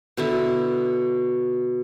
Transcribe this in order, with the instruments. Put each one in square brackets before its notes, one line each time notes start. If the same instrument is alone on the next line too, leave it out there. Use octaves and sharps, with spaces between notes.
[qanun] B2 D3 E4